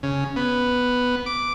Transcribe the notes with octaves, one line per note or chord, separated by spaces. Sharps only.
C#3
B3
D6